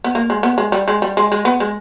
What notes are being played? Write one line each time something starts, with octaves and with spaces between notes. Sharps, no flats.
B3
A#3
G#3
B3
G#3
G3
G#3
G3
G#3
G#3
B3
G#3